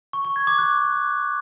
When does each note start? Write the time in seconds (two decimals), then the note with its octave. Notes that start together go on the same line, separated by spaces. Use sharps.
0.13 C#6
0.25 C#6
0.36 G#6
0.47 D6
0.58 F#6